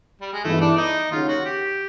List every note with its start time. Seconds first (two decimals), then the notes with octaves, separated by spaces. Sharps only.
0.21 G3
0.33 G#3
0.44 G2 E3 G#3 A3 B3 E4
0.61 D4
0.77 D#4
1.10 D#2 C#3 F#3 F4
1.28 F#4
1.45 G4